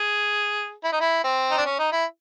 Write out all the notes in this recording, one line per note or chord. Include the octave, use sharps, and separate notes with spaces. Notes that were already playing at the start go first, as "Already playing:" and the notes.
Already playing: G#4
E4
D#4
E4
C4
D#4
D4
C#4
D#4
E4